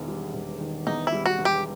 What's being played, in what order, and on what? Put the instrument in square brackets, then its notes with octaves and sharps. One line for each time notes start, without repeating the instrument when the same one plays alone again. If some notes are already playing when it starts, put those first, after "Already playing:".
Already playing: [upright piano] E1 E2 D#3
G3
E1
D#3
[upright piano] E2 [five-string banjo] D#4
[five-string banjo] E4
[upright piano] G3
[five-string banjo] F#4
[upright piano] E1
[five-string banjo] G4